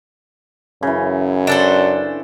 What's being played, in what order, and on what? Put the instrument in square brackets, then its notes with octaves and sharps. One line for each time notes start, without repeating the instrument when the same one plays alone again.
[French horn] F#2 [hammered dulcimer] C#3 E3
[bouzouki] D4 A4 C5